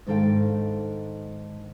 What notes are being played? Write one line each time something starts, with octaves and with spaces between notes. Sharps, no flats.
G#2 D#3 D4 A4 F5 G5